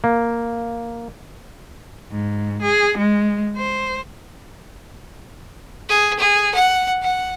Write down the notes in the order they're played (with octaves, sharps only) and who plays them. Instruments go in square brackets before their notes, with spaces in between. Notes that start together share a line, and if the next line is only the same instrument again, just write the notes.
[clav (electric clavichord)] A#3
[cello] G#2
G#4
G#3
C5
[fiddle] G#4
G#4
F#5
F#5